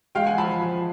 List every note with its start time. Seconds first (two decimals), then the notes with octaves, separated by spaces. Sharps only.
0.15 G#3 F5 G5
0.26 F#5 G#5
0.38 F3 A5 B5
0.61 F3